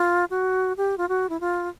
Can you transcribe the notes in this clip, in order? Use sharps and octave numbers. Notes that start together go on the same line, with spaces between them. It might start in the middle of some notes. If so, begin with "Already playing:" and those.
Already playing: F4
F#4
G4
F4
F#4
E4
F4